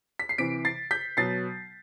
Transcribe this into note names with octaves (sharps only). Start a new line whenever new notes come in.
B6
C7
C3 E3 B6 D7
A6 C7
G6 B6
B2 F#3 A6 C7